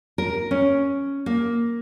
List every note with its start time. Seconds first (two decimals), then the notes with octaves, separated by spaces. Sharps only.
0.18 A#4
0.51 C#4
1.26 A#3